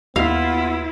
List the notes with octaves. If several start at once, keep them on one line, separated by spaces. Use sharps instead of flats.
D#2 B3 E4 F4 F5